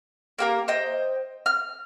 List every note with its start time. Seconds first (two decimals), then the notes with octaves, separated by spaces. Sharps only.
0.39 A#3 G4 A#4
0.68 C5 D#5 G5
1.46 F6